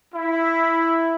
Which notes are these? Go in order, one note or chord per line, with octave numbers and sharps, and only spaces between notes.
E4